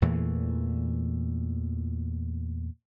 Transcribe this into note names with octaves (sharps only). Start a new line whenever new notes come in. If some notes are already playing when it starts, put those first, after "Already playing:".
E2 A#2 E3 A3